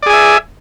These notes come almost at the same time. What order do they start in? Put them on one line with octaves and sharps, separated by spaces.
D5 G#4 G#5 E5